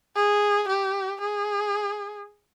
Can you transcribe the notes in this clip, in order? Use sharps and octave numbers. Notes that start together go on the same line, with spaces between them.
G#4
G4
G#4